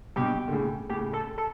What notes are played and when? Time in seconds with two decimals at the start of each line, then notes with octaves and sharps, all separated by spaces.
0.16 G2 B2 G4
0.48 D3
0.52 A2 C#3
0.89 A2 C#3 G4
1.13 A4
1.38 A4